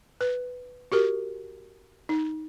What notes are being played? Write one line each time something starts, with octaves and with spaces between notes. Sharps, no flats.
B4
F#4 G4 A#4
D#4